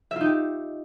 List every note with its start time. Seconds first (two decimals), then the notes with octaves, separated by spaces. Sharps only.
0.11 E5
0.16 F4
0.21 D#4
0.25 G4